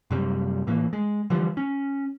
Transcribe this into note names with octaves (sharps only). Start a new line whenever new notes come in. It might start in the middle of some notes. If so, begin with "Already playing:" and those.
F#2 C3 G3
A2 E3 A#3
G#3
D3 E3 F3 G3
C#4